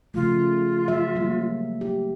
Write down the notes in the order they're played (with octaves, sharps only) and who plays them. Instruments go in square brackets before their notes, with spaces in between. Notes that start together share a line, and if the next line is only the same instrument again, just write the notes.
[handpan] C#3 F3 A3 [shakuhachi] F4
[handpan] F#3 E5
F#3 G3 A#3
G4